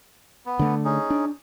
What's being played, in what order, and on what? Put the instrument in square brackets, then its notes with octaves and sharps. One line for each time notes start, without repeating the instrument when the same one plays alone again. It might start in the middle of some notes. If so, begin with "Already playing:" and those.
[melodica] B3
[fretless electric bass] D3 A3
[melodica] C#4 D#4 G#4
[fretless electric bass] D4